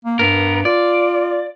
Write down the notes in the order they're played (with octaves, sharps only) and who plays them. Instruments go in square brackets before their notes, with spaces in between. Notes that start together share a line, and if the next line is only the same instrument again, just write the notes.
[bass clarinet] A#3
[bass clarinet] G2 [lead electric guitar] B3 A#4
[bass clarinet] F4 [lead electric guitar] D5